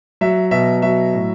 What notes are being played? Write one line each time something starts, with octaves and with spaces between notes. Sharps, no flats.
F#3 E5
B2 E5
F#3 E5
A2